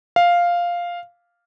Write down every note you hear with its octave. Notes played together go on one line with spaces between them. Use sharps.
F5